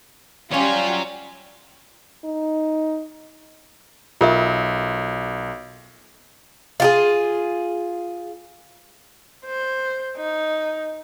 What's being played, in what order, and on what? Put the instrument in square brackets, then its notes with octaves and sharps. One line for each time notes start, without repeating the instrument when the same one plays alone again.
[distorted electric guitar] F#3 C#5 [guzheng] G3 C#4 [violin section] F4 G4
[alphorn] D#4
[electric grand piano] B1 [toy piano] F4 A#4 E5
[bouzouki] F4 G4 G#4
[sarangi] C5
D#4